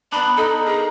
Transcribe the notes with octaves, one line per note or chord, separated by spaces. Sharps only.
B3 D4 B5
D#4 A4
G#4 A#4